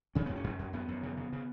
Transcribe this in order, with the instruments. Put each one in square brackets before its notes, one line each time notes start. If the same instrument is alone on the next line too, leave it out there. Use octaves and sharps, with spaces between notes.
[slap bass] C#3 C#4
F#2 B3
C#4
F#2
F#2
F#2 B3
F#2
C#3
C#3
C#3